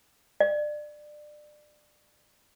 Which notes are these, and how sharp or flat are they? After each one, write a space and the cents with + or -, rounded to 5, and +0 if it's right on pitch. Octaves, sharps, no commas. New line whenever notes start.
D5 +25